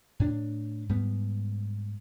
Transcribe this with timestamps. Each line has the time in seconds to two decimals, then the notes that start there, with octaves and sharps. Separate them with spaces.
0.20 A2 D4
0.89 G#2 G3 B3